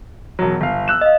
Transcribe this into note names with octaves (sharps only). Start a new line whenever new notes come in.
E1 F#3
G1 F5
E6 F#6 E7
D#5 F5